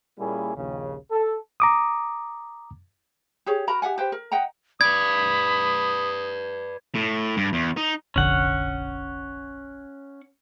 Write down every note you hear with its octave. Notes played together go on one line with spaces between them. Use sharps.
A#2 G3 A#3 C#4 E4 G#4
A#1 D#2 C#3
A4
A#5 D6 D#6
G4 G#4 C#5
F#4 A#4 A#5 B5
G4 E5 F#5 G#5
G4 B4 C5 G5
A#4
D#5 F#5 G5 A#5
B4 D5 B5 D#6 G#6
A2
G2
E2
D#4
F1 A#1 D3 C#4 F#5